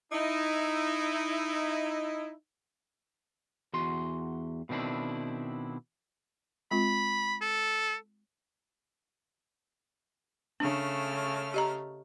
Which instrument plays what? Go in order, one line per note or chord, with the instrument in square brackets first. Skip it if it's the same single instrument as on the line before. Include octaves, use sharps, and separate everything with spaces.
[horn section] D#4 E4
[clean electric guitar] E2 F#4 C6
B2 D#3 C4 D4 E4
[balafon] G#3 C4 F4 [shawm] B5
[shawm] A4
[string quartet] C#3 A3 F6 [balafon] D4
[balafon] G4 D#5 A#5